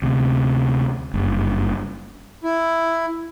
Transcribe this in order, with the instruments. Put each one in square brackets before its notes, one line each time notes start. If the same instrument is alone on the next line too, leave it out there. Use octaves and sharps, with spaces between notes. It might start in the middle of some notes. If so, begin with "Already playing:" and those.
[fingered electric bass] D2 C3
F#1 G2
[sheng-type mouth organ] E4